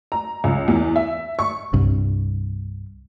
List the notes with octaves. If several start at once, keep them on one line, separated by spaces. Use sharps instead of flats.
A#5
C#2
E2
E5
C#6
C2 G2